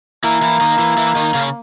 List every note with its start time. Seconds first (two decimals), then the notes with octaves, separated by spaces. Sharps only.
0.24 E3 A#3 E4
0.42 E3 E4
0.61 D#3 D#4
0.79 E3 E4
0.98 E3 E4
1.16 D#3 D#4
1.34 C#3 C#4